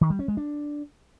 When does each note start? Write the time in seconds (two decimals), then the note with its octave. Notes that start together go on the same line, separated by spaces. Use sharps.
0.01 D#3
0.10 G3
0.19 C#4
0.28 G#3
0.37 D4